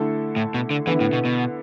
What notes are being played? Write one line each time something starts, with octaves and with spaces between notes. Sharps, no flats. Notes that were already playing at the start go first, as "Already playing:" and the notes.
Already playing: D3 A3 E4 A4
A2
B2
D3
D3 E3 B3 E4
A2
B2
B2